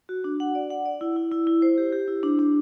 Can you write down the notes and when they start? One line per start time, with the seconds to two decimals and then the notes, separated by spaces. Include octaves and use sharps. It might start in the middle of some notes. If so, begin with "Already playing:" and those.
0.09 F#4
0.24 D4
0.40 F#5
0.55 D5
0.70 F#5
0.85 D5
1.01 E4
1.16 E4
1.31 E4
1.47 E4
1.62 C5
1.78 G4
1.92 G4
2.08 E4
2.23 D4
2.39 D4